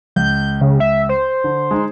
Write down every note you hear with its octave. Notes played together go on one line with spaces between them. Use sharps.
C#2 G6
C#3
E5
C5
D3
G#3 D#4